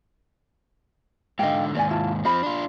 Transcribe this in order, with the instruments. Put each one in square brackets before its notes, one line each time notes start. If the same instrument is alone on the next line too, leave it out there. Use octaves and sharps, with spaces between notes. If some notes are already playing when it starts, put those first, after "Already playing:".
[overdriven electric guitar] G#2 D3 [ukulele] D#5 F5 G5
[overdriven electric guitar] D#2 G#2 [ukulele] A#4 D5 G#5
[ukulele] E4 F4 A5
[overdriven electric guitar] F3 C4 [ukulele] D#5 B5
[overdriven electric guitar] D4 F4